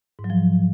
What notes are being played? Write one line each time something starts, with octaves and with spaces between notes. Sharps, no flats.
G#2
F#3
F3